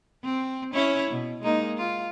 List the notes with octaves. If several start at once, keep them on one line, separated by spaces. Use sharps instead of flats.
C4
C#4 E4 C#5
B2
G#3 A#3 D#4
F4